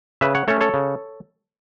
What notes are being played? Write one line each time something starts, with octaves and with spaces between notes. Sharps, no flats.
C#3 B4 E5
C#5 F#5
A3 C#4 A4 C#5
A4 C#5
C#3